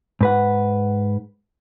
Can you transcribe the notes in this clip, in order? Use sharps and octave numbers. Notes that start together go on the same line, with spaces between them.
G#2 B4 F#5